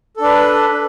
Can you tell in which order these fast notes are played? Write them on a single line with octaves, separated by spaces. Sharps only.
A4 D4 B4